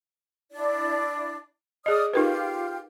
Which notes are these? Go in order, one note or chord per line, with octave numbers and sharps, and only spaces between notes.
D4 E4 D5
G#4 D5 D#5 D#6 F6
D#4 F4 G4 A#4 B4